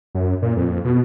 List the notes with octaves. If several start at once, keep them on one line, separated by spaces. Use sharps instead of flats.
F#2
A#2
F2
B2